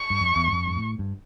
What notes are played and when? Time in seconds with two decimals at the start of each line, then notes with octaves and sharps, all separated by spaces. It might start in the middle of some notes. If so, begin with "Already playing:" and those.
Already playing: C#6
0.10 G2
0.20 F2
0.36 E2
0.47 G2
0.52 F2
0.66 G2
0.76 A2
0.99 G2